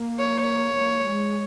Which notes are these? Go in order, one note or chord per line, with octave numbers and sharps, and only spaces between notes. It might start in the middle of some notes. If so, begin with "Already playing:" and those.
Already playing: A#3
C#5
A#3
G#3